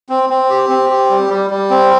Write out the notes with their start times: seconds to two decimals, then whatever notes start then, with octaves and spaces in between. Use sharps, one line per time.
0.09 C4
0.30 C4
0.50 G4
0.69 C4
0.90 G4
1.10 G3
1.30 G3
1.50 G3
1.70 C4